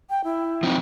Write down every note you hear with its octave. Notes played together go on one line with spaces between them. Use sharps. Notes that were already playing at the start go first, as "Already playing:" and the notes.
G5
E4
F3 C4 D#4